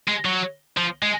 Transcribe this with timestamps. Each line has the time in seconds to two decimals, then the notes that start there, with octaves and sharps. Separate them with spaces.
0.08 G#3
0.25 F#3
0.77 F3
1.03 G#3